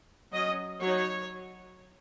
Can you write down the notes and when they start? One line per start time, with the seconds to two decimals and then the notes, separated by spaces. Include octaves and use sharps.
0.33 F#3 C#4 D#5
0.82 F#3 D#4 C#5